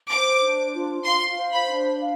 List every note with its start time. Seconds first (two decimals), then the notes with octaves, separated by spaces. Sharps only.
0.11 C5 D6
0.42 D4
0.74 F4
1.05 F5 C6
1.37 C5
1.52 B5
1.69 D4
1.99 F5